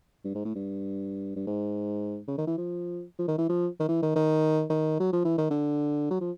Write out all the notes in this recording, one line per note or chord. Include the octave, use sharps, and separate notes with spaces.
G2
G#2
A2
G2
G2
G#2
C#3
D#3
E3
F3
F3
D#3
E3
F3
D#3
E3
D#3
D#3
D#3
F#3
F3
E3
D#3
D3
F#3
F3